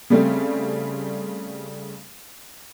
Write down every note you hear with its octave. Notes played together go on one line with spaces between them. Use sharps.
C#3 G3 A3 C4